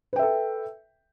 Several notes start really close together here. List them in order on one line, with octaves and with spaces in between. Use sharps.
B4 G5 E5 A4